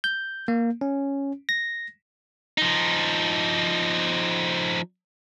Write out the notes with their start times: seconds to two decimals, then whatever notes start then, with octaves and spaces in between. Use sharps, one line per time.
0.04 G6
0.48 A#3
0.81 C#4
1.49 A#6
2.58 F3 D#4